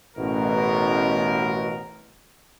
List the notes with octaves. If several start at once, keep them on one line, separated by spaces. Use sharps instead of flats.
A1 B2 A#4